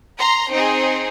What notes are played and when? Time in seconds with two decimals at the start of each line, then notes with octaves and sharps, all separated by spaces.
0.17 A#5 C6
0.52 C4 D#4 G#4